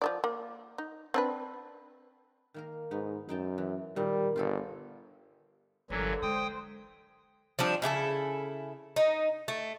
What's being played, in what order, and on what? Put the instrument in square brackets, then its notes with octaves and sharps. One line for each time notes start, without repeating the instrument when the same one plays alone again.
[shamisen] F3 A4 D5
A#3
D#4
C4 D4 B4
[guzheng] D#3 A#3 A#4
[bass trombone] G#2 [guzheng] B3 D#4
[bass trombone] F#2 [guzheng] D#4 G5 A5
[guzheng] E3
[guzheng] A#2 D#3 [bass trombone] G3
[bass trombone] G1 [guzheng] F4 G4 A4
[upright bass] G1 [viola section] D3 A#4 [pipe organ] E3 F#3
[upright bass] G#3 [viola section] C5 [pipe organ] G5 D#6
[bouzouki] F3 G3 D4
C#3 E4 G4 A4
D#4
A3